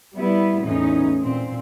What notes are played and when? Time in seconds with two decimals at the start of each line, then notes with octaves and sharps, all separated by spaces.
0.16 G3 B3 E4
0.63 E2 A2 C#4 D#4
1.21 A#2 C4